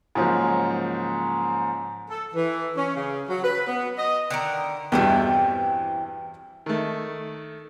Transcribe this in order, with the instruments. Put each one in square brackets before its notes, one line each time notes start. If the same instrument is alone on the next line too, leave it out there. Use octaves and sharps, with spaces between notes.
[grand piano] G#2 C#3 F3 F#3 A#3 F#4
[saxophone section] A4
E3
C#4
C#3
F#3
B4
B3
D#5
[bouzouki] D3 D#3 A#4
[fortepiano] E2 G2 B2 [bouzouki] E3 C4 G5
[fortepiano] D#3 A3